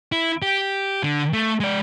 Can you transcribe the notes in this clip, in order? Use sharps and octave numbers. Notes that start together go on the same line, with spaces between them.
E4
G4
D3
A3
G#3 D5